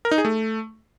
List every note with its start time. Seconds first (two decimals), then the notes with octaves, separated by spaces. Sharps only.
0.05 A#4
0.11 D#4
0.18 G#4
0.25 A3